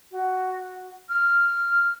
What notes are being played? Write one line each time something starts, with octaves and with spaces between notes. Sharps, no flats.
F#4
F6